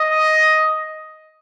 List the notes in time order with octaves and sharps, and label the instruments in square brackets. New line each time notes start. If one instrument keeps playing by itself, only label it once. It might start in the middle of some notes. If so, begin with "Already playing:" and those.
Already playing: [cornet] D#5